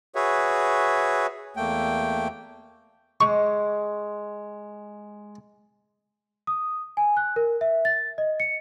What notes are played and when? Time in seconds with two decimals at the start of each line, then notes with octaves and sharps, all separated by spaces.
0.15 F#4 G#4 B4 C#5 E5
1.57 E2 A3 A#3 G5
3.21 G#3 C#6
6.47 D#6
6.97 G#5
7.17 F#6
7.36 A#4
7.61 E5
7.85 A6
8.18 D#5
8.40 C#7